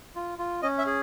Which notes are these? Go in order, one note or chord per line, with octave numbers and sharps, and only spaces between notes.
F4
F4
C#4 D#5
E5
G#4